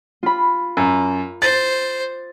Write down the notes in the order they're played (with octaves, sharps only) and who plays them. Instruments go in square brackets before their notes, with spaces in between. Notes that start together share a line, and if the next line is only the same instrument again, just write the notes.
[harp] F4 B5
[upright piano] F#2
[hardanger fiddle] C5 [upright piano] A6